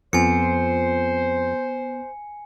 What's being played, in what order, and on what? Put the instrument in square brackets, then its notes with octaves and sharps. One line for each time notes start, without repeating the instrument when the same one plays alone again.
[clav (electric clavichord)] F2 [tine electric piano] B3 [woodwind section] C5 [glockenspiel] G#5 C#7